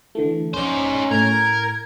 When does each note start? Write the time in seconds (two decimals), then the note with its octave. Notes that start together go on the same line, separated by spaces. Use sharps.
0.15 D3 E3 A3
0.54 A#1 C#4 D#4 C5 D5
1.11 A2 A#4 G#6